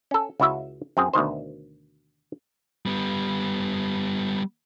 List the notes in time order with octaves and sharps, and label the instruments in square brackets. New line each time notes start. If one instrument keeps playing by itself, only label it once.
[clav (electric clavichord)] C#4 A4
C#2 C#3 E4 F#4 E5
F#2 C4 G#4
D2 B2 D#3 C5
[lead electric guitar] G3 B3